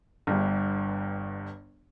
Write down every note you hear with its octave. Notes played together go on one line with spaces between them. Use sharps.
G1 G2